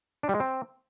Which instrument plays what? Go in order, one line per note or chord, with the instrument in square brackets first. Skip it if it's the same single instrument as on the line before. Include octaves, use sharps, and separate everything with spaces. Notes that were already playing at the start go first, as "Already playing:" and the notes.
[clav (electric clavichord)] D4
G3
G#3
C4